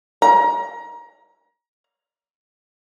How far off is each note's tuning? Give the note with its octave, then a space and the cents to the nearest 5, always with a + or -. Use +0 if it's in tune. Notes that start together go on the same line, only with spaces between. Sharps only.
A#5 +25